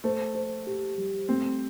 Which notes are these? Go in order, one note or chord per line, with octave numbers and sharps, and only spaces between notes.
A3 C5
C5
G4
G3
A3 C4